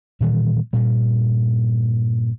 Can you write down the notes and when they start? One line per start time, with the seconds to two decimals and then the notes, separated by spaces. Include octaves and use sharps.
0.21 A#2 D#3 E3 G3
0.73 G2 A#2 G3